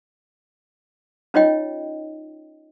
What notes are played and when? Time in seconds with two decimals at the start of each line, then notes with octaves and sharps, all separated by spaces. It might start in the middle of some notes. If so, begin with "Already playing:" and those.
1.34 C#4 D#4 F4 C#5 D#5 G5